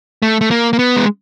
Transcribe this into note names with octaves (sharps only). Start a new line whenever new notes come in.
A3
A3
A#3
A#3
B3
G#3